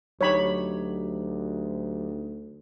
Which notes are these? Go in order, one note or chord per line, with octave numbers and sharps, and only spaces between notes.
D2 F#3 D#4 G4 C#5 B5